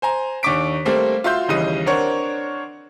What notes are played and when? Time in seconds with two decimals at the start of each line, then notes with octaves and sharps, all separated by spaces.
0.02 C5 G#5 A#5
0.43 D#2 D4 C#6 D6 B6 D7
0.85 G3 A3 A#3 C4 C5
1.24 F4 F#4 E5 C6 G6
1.48 D#2 C#3 E3 G3 D#5 D#7
1.86 C4 D4 A#4 C5 C#5 F#5